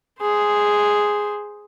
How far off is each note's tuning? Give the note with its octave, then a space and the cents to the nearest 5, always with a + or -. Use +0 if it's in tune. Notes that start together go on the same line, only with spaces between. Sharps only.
G#4 +0 C5 +0